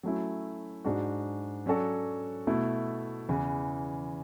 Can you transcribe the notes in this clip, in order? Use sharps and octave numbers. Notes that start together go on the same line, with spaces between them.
F#3 A3 C#4 E4
G#2 G#3 D4 F#4
F#3 C#4 F#4 A4 D5
B2 A3 E4
E2 C#3 E3